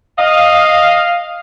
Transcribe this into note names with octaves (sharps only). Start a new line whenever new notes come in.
D#5 F5